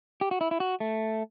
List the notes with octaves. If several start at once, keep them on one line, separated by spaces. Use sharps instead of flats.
G4
F#4
E4
E4
F#4
A3